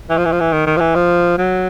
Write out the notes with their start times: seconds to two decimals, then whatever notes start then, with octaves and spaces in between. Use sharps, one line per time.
0.10 E3
0.18 F3
0.25 E3
0.32 F3
0.41 E3
0.53 D#3
0.67 D#3
0.77 F3
0.80 E3
0.95 F3
1.38 F#3